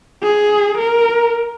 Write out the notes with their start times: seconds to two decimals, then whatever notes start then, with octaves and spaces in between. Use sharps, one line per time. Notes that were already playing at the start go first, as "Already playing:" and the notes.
0.23 G#4
0.78 A#4